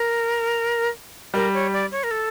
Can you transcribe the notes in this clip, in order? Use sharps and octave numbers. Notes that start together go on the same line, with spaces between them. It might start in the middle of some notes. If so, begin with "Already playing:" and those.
Already playing: A#4
G3 A#4
C#5
D5
C#5
A#4
A4